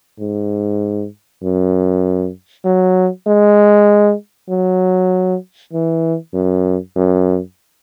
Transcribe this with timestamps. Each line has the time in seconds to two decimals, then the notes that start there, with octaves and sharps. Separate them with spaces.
0.19 G#2
1.43 F#2
2.65 F#3
3.27 G#3
4.49 F#3
5.73 E3
6.33 F#2
6.96 F#2